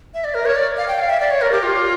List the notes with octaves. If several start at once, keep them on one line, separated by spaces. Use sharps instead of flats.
E5
D5
A#4
C#5
D5
F5
G5
F5
E5
D5
C#5
A#4
G4
F4